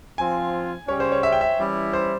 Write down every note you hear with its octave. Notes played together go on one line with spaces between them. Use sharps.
F3 C4 F4 G#5
C#3 G3 C#4 C#5
C5
C#5
E5
G5
E5
E3 G3 C#4 E4
C5